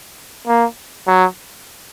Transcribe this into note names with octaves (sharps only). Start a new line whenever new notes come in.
A#3
F#3